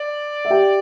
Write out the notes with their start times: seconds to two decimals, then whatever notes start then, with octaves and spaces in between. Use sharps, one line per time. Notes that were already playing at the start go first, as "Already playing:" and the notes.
Already playing: D5
0.45 E5
0.50 G4 G5